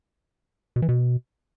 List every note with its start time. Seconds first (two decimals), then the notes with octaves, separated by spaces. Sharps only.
0.76 B2
0.82 E3
0.89 B2